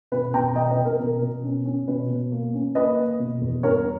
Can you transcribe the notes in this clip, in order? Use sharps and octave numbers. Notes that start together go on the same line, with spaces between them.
B2 B4
B2 G5 A#5
B2 D#5 G5
B4 D#5
B2
A#4
B2 A#4
B2
C#4
C#4
B2 B4
B2
A#3
C#4
A#3 B4 D#5
A#3
B2
E2
G2 A#4 C#5